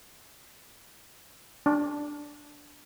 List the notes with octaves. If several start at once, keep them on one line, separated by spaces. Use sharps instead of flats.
D4